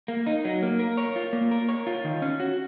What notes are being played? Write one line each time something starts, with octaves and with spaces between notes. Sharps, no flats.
A#3
D#4
F#3
A#3
A#4
C#5
F4
A#3
A#4
C#5
F4
D#3
C#4
F#4